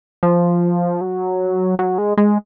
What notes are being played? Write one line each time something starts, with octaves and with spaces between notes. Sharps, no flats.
F3
F#3
F#3
G#3
G#3